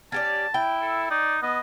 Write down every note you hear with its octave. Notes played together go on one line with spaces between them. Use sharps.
C#4 G4 D5 A5
E4 G5
A4
D#4 D5
B3 D#5